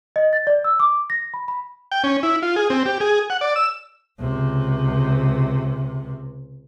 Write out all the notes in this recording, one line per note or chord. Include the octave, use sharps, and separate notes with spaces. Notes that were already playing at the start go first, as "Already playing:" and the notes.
D#5
A6
D5
E6
D6
A#6
B5
B5
G5
C#4
E4
F4
G#4
C4
G4
G#4
F#5
D5
E6
C#2 C3